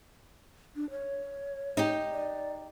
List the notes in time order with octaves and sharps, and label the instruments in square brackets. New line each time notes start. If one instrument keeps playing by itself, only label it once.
[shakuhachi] D4
C#5
[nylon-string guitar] D#4 G4
[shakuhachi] D5